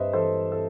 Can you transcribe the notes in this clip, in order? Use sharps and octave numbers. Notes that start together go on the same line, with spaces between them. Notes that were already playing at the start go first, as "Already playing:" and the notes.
Already playing: G2 B4 C5 D#5 E5
E3 A4 C5
A4